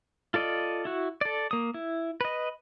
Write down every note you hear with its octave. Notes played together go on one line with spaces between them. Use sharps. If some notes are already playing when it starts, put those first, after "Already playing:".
F4 A4 D5 D#5
E4 F#4
A4 D5
A#3 D#6
E4
B4 D#5